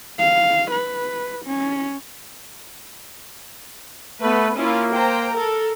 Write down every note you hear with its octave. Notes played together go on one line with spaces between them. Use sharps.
F5
B4
C#4
A3 B3 B4
A#3 C#4 E4 F4
C5 G5 A#5
A4 A#4